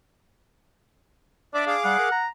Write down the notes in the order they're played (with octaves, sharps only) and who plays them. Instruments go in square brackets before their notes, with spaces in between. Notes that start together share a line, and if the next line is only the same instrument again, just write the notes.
[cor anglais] D4 [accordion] D5 E5 D6
[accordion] G#4 F5 D6
[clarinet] G3 [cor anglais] F#5
[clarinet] A#4
A#5